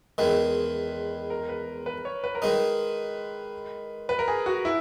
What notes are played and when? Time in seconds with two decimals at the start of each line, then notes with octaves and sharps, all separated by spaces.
0.18 E2 D#3 G#3 B4
1.30 A#4
1.49 B4
1.86 B4
2.05 C#5
2.24 B4
2.35 A#4
2.42 D#3 G#3 D#4 B4
4.09 B4
4.19 A#4
4.28 G#4
4.46 F#4
4.65 E4